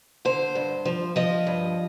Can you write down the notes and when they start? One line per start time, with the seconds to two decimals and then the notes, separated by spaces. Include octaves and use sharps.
0.25 D3 C5
0.55 G2
0.85 F3
1.16 F3 D#5
1.47 G2